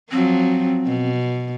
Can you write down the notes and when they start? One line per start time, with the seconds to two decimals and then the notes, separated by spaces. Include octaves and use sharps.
0.12 F3 F#3 C4
0.86 B2